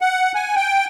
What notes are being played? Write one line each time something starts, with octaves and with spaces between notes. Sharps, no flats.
F#5
G#5
G5